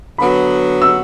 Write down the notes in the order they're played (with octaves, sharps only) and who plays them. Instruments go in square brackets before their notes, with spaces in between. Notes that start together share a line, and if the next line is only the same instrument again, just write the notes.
[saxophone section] D3 F#3 B3 F#4 [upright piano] B5
[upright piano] E6